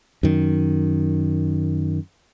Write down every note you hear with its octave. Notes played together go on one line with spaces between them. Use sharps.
F#2 D#3